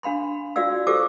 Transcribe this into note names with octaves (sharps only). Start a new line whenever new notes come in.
D4 F5 B5 C6
F4 F#4 D5 F5 E6
F4 G4 A4 C5 D6 E6